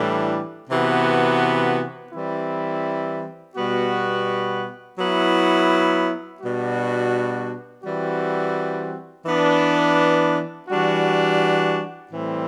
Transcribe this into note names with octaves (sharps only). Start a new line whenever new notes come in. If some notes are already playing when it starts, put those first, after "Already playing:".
Already playing: A2 E3 G3 D4
C3 E3 B3 F#4
E3 G3 C4 E4
B2 G3 B3 F#4
F#3 B3 E4
B2 G3 D4 F#4
E3 G3 C4 F#4
E3 B3 D4
E3 G3 D4 F#4
A2 E3 G3 C4